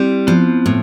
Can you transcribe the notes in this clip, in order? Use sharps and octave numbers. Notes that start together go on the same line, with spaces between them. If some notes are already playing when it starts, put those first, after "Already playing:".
Already playing: G3 C4 E4
F3 B3
A2